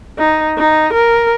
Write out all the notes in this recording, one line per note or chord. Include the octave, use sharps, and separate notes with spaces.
D#4
D#4
A#4